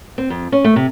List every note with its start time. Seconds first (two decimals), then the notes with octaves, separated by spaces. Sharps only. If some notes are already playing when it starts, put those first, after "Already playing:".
0.18 C4
0.30 F2
0.52 C#4
0.64 A3
0.76 C3